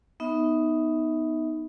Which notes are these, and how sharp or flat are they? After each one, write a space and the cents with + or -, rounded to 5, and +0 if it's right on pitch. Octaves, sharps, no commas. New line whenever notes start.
B3 +0 D#4 +0 E5 -30